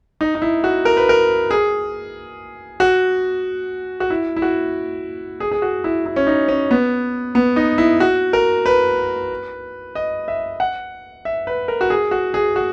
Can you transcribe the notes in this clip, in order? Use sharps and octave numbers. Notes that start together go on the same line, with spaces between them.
D#4
D#4
E4
F#4
A#4
B4
A#4
G#4
F#4
F#4
E4
E4
F#4
G#4
G#4
F#4
E4
E4
C#4
D#4
C#4
B3
B3
D#4
E4
F#4
A#4
B4
D#5
E5
F#5
E5
B4
A#4
F#4
G#4
F#4
G#4
F#4